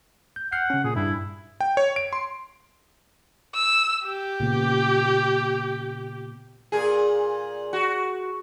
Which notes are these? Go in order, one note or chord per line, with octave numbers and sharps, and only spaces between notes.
G6
F#5 F6 G6 C7
C#3 C#4
A#2 G#4
G2 E4
G5
C#5
D7
C6
E6
G4
A#2 C#3 B3
A#2 G#4
F#4